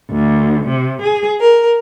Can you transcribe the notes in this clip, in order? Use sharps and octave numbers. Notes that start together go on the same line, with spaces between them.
D2
C3
G#4
A#4